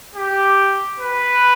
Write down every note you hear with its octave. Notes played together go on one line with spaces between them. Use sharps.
G4
B4